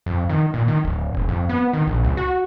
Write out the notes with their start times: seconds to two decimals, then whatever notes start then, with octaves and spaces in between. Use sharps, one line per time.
0.06 F2
0.29 D#3
0.54 A#2
0.68 D#3
0.84 D1
1.13 E1
1.29 F2
1.49 B3
1.73 D#3
1.87 A#1
2.04 C#2
2.17 F#4